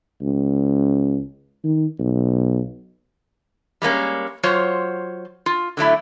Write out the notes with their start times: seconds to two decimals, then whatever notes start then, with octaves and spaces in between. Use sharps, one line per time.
0.22 C#2
1.64 D#3
1.99 B1
3.82 G3 G#3 A#3 C#4
4.43 F#3 F4 C5 C#5
5.46 F4
5.77 D3 F#3 A3 E4